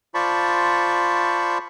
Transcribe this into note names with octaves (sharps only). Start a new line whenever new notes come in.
F4 C5 D5 A5 B5 C#6